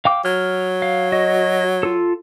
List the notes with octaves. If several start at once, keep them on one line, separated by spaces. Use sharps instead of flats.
F5 G5 D6
F#3 F6
F5
F#4 D#5
F4 A4